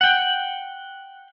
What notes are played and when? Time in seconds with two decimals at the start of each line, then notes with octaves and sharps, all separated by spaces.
0.01 F#5 G5